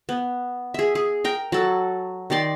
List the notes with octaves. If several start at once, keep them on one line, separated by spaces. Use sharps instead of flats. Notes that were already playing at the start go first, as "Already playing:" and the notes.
B3
G#4 E5
G#4
A#4 G5
F#3 A4
D#3 G4 D5 C6